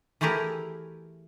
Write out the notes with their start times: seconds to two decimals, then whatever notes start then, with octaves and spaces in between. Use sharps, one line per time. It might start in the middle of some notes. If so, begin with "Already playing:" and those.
0.21 E3 A3 E4 G4 G#4 A#4